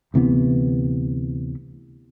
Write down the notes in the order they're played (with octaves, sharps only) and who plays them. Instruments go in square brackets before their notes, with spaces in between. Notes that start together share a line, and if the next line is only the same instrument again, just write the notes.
[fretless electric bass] D2 C3 E3 B3